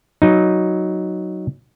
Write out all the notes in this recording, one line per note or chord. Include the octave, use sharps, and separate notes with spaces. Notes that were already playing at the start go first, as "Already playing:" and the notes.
F#3 D#4